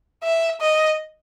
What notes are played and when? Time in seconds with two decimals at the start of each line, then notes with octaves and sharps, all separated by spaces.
0.23 E5
0.61 D#5